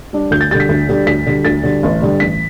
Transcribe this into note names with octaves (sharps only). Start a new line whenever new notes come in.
G3 D4
D2 G6
A6
D3 G3 A6
B6
D2
D3 G3
D2 B6
D3 G3
D2 A6
D3 G3
A1
G2 D3 G3
A1 B6